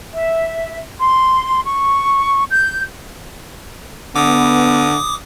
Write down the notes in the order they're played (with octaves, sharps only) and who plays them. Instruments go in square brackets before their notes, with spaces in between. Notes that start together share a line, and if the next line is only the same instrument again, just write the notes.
[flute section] E5
C6
C#6
G6
[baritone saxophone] D3 [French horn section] B3 [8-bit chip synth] D6 D#6